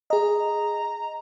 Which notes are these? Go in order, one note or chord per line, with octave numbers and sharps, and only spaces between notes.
G#4 D#5 A#5